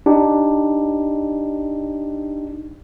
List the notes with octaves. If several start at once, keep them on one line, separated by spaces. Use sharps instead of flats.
D4 D#4 G4